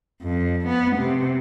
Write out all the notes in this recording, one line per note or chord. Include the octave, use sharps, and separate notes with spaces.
F2
B3
C3